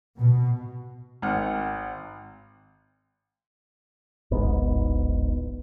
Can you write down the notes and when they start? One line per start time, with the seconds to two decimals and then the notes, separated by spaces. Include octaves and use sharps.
0.19 B2
1.22 G#1 F#5 F6
4.31 D1 G#1 G#2 B3